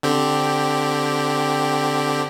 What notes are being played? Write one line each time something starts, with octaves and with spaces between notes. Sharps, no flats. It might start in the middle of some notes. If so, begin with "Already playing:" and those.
D3 C4 G4